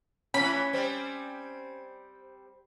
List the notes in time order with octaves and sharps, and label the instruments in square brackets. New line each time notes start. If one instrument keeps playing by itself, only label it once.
[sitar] A2 E3 [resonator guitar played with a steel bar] C#4 [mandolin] B5
[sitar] G3 C4 [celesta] C5